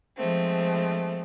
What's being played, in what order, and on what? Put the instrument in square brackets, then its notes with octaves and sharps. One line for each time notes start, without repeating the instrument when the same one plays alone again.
[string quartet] F3 G#3 A3 C4